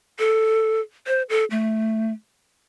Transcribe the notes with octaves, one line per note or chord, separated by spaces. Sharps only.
A4
C5
A4
A3